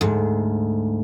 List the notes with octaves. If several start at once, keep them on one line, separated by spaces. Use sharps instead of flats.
D2 G#2